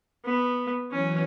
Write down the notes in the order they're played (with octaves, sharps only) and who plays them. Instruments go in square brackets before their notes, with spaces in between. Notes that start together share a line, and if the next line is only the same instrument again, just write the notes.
[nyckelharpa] B3
[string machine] E3 F#3 [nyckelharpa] C#4